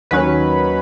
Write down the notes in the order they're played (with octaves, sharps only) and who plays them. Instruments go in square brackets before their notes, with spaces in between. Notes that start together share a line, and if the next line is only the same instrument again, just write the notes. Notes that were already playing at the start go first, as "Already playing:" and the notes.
[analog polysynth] D#2 D#3 F#3 C#4 B4